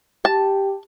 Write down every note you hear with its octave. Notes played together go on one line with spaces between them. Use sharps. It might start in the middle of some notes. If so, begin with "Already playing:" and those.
G4 A5